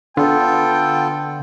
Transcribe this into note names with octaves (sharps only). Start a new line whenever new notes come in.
D3 B3 F4 A4 G5